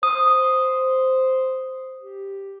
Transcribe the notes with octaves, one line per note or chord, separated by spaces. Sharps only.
C5 D#6
G4